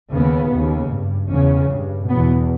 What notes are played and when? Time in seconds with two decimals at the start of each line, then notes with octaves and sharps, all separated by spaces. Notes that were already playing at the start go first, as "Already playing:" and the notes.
0.12 D#2 C#3 B3
0.51 D#2 C#3
0.91 G2
1.29 E2 C#3 C#4
1.70 G2
2.08 E2 B2 B3